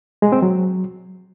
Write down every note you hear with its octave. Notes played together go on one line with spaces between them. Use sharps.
G#3
C4
F#3